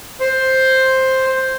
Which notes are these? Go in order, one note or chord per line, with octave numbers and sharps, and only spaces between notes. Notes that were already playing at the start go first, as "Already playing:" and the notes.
C5